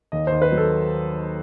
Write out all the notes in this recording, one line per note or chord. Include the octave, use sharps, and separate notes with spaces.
D#2 D#5
D#2 C5
B4
F#3
A4